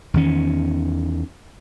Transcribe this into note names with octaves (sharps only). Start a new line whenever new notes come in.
E2 D#3 C#4